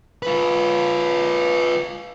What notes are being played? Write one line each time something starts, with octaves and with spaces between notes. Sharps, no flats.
F4 B4